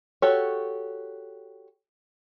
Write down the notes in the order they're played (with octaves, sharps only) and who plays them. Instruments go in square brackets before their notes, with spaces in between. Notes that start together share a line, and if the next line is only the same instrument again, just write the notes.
[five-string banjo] F#4 G4 A4 C#5